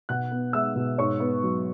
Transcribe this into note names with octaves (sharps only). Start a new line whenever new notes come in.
B2 F#5 F#6
B3
G#3 E5 E6
B2
G#2 C#5 C#6
B3
F#3